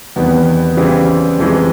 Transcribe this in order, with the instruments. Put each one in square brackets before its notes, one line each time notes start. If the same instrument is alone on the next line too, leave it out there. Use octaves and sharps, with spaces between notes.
[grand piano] E2 C3 D#3 G3 B3
C#3 E3 G3 C4
F2 C3 E3 G#3